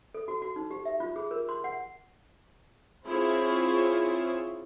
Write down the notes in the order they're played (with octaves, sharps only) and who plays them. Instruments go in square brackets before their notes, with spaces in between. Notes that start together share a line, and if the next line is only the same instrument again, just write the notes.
[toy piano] A4
F#4
F#4
D#4
G4
E5
F4
G#4
A#4
C6
F#5
[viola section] C4 E4 F4 G#4 C5 C#5